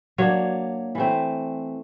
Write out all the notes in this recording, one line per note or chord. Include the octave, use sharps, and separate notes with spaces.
F#3 A#3 D4 C#5
E3 A3 C4